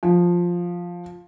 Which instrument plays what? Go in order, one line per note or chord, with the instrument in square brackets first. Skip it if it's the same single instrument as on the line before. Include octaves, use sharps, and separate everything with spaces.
[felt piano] F3